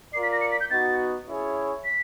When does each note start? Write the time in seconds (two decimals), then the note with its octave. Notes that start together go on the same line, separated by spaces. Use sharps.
0.13 F4 A#4 D5 C7
0.23 B6
0.32 A#6
0.41 C#7
0.52 B6
0.61 G6
0.70 B3 D#4 F#4 A6
1.27 C#4 E4 G#4 C#5
1.85 B6